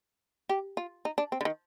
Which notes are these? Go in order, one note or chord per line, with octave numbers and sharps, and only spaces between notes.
G4
F4
D#4
D4
C4
D3
D#3